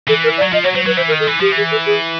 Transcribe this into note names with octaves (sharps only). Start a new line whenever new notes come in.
E3 A4
A#4
D5
F#3
F3 D#5
F#3 C#5
F#3 C5
F#3 B4
E3 C5
A#4
D#3
A4
E3
F3 G4
E3
G#4
A4
G#4